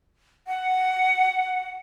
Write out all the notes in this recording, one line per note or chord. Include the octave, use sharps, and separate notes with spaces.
F#5